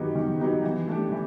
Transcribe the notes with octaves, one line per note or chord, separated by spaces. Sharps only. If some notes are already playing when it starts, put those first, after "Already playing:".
Already playing: D#3 F#3 B3 D#4 G4
D#3
F#3 B3 D#4 G4
E3
A3 D4 G4
E3